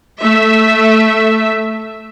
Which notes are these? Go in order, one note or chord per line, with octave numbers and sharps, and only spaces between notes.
A3 E5